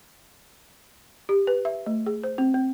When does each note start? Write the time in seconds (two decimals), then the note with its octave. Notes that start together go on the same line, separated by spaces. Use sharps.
1.29 G4
1.47 B4
1.65 E5
1.86 A3
2.06 G#4
2.24 C5
2.38 C4
2.54 C4